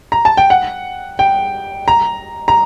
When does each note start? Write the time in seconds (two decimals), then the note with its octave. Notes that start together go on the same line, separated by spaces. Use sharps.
0.12 A#5
0.25 A5
0.37 G5
0.50 F#5
1.19 G5
1.88 A#5
2.48 A#5